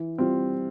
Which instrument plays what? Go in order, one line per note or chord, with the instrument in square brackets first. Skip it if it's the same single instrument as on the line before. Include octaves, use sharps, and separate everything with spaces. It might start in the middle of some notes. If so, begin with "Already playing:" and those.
Already playing: [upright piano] E3
G3 C4 F4